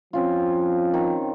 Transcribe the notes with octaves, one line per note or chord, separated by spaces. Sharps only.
F3 C4 C#4 F4
D#3